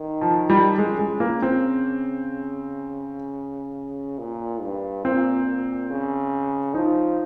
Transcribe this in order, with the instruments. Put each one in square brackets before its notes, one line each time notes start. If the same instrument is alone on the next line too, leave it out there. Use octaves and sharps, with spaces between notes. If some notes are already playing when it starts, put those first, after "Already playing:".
Already playing: [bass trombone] D#3
[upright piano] F3
G3
[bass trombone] C#3 [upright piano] G#3
[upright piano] G#3
A#3
C4
[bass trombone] A#2
G2
[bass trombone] A#2 [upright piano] C4
[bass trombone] A#2
C#3
[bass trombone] F3 [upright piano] D#4